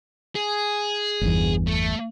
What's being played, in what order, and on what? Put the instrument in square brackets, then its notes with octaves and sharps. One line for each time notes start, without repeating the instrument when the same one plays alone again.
[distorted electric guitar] G#4
[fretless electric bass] G1 E2
[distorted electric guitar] A3